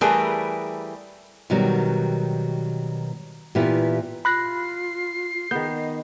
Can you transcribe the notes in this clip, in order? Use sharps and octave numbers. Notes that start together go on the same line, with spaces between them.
E3 G3 A3 G#4 A#4 B4
B2 D#3 F#3 G3
A#2 E3 B3 E4 F4 G4
F4 B5 F#6 A#6 C7
D#3 B3 G#4 G6
D#5